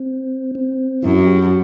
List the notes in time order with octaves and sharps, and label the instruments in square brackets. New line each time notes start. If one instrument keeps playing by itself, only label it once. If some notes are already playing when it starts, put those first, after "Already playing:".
Already playing: [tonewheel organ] C4
C4
[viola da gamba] F#2 [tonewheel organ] E4
[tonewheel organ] F#4
G4
F#4